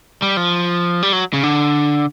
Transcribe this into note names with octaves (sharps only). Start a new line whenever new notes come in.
G3
F3
G3
F#3
C#3
D3